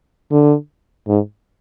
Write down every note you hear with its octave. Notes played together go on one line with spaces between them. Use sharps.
D3
G#2